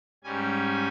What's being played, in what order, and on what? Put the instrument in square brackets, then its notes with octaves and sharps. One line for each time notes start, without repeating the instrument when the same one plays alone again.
[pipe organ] G#2 G3 C#4 G#5